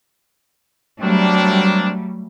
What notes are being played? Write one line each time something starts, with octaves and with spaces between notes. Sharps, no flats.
F#3 G3 A3 A#3 C4 D4